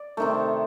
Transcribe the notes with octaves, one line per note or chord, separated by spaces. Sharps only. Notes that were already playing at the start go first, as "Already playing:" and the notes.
Already playing: D5
C3 D#3 A3